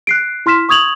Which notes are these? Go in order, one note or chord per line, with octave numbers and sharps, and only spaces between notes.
F#6 C7 D7
E4 C6 F6 B6 E7
C#6 D#6 G#6 F7 F#7